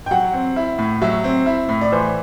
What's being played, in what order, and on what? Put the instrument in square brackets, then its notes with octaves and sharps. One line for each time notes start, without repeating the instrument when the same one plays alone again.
[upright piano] G5
[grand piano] F#3 [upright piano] F#5
[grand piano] C4
E4
A2
[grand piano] F#3 [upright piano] E5
[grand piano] C4
E4
A2
[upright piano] D5
[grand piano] E3 [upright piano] C5